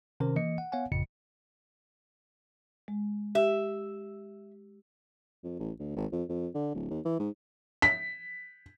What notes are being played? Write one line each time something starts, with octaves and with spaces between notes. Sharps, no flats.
C3 D#3 C#4 A#4 C5
E3 A#3 D#5 C#7
F#5
B3 C#5 F5 F#5 G#5
G1 F2 A2 C#3 C#7
G#3
G4 E5
F2
A1
D2
G#1
F2
F2
D3
D1
D#2
E3
G#2
B6